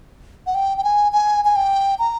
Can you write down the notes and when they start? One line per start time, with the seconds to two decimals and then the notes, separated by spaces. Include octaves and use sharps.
0.46 F#5
0.55 G5
0.78 G5
0.84 G#5
1.12 G#5
1.45 G#5
1.56 G5
1.99 A#5